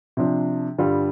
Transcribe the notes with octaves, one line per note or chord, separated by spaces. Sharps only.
C3 F3 D4
G2 D3 G3 F4